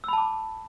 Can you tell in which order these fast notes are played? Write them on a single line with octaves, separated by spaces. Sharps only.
E6 B5 A5 D6